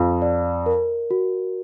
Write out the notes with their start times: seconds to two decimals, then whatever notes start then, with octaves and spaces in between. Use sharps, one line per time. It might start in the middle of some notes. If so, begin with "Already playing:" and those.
Already playing: F2 F5
0.22 D5
0.66 A#4
1.11 F#4